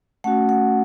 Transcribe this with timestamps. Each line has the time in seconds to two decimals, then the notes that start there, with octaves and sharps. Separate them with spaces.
0.24 A3 C#4 F#4 F#5
0.49 F#5